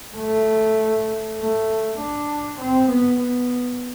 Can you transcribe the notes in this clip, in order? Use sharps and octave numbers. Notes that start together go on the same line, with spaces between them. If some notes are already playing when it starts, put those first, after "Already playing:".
A3
A3
D4
C4
B3
B3